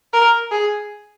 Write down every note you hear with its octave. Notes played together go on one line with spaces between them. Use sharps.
A#4
G#4